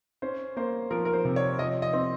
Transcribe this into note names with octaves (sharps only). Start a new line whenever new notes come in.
C#4 C5
A#3 C5
F3 A#4
A#4
C5
C3
C#5
F3 D#5
D#5
C4